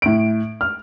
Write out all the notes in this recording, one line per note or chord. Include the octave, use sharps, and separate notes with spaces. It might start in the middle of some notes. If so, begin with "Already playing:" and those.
A2 D7
F6